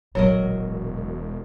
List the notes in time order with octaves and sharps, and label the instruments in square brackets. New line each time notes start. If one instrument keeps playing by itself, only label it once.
[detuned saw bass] E1 [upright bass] A#1 D3 [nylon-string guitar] F#3 A#4 D#5 [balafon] C#5